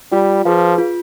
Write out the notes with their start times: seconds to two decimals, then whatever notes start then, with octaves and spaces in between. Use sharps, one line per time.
0.12 G3 F4
0.45 F3 G#4 B4 F5
0.78 F4